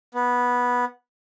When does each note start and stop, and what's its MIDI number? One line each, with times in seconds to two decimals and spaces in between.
0.14 0.85 59